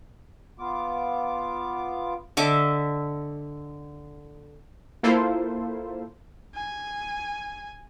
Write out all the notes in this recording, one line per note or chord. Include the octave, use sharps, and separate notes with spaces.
B3 F4 D6
D3 D#5 E5 D6
A#3 E4 F4 A4 C5
G#5